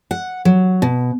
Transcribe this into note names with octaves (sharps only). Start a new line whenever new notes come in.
F#5
F#3
B2